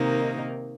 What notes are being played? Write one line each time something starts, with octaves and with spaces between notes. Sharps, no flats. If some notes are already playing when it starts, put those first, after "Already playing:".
Already playing: C3 D#3 A#3 D#4